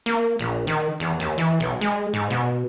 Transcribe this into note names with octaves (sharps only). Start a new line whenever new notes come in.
A#3
A#1
D#3
E2
D#2
E3
B1
G#3
G#2
B2